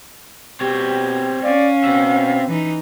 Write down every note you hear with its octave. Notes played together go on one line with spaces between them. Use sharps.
B2 C4 G4 C#5
C#4 D5 F5
B2 C4 E5
E3 D#4